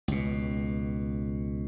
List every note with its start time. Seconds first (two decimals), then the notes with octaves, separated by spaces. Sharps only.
0.08 C#2 B2